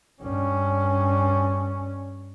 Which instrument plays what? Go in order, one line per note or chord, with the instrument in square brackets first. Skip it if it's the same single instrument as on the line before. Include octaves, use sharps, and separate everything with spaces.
[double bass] G2 C#4